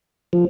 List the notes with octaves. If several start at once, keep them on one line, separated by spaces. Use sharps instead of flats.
F3